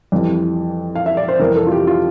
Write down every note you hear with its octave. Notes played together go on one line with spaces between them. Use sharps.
F2 E3 G3
F5
E5
D5
C5
F2 C3 E3 G3 A#4
A4
F4
G4
F4